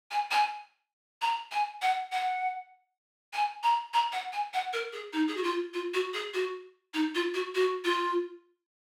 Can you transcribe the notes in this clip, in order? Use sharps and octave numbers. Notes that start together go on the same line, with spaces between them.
G#5
G#5
A#5
G#5
F#5
F#5
G#5
A#5
A#5
F#5
G#5
F#5
A#4
G#4
D#4
G#4
F#4
F4
F4
F#4
G#4
F#4
D#4
F4
F#4
F#4
F4